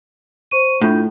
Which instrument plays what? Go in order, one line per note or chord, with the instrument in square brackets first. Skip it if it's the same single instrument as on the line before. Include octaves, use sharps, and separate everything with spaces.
[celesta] C5 C#6 D#7
[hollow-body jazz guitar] A2 [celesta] D4 F4 G6